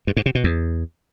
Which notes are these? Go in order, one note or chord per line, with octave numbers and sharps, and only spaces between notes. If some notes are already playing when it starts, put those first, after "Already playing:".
G2
G#2
C3
B2
E2